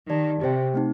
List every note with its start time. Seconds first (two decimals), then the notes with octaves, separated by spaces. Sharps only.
0.09 D#3 G4 D5 A5
0.41 C3 G4 C5 G5
0.74 A3 C4 D#4